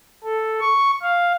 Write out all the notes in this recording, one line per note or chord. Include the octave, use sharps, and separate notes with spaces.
A4
C#6
F5